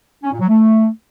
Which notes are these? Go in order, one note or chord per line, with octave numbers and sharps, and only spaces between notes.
C#4
A#2
F#3
A3